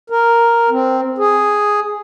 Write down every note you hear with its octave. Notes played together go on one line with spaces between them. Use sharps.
A#4
C4
G#4